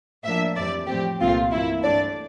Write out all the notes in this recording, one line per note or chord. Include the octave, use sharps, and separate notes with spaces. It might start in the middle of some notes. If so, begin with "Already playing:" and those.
A2 F3 A#3 D4 E5
F2 E3 G3 D5
A2 F3 C4 G4
C2 A#2 A3 C4 F4
G2 E3 A#3 E4
G2 E3 A3 D4 D5